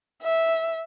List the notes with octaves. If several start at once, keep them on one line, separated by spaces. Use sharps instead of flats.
E5